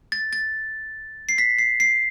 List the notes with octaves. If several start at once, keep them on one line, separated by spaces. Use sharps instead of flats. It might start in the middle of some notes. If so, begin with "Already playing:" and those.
A6
A6
C7
B6
C7
C7